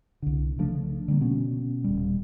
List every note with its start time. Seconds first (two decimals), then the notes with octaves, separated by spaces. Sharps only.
0.22 C2 D3
0.59 C#3 F3 A3 D4
1.08 D3 G3 A3 A#3
1.21 B2 B3 C#4
1.84 D#1 G3